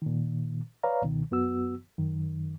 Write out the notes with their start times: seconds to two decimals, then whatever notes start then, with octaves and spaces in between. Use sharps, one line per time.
0.02 A#2 D#3
0.83 B4 C#5 D5 F5 A#5
1.02 C#2 B2 D#3
1.31 F#2 B3 F#4 E6
1.98 F#2 D#3